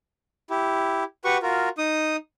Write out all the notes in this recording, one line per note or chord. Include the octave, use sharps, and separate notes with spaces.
E4 G4
F#4 G4 B4 F#5 C#6
F4 F#4 A#4
D#4 D#6